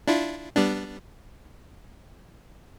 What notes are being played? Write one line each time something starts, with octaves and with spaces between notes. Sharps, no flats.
D4 E4 F4
G3 B3 D4